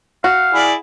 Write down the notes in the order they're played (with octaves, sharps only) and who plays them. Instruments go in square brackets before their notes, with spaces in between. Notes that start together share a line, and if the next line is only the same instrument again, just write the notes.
[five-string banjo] F#4 [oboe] F5
[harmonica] E4 G#4 D5